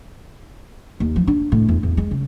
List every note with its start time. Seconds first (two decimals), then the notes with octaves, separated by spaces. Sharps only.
1.00 D#2
1.16 F3
1.27 D4
1.52 A2
1.69 E2
1.83 E2
1.97 G#3
2.11 C#3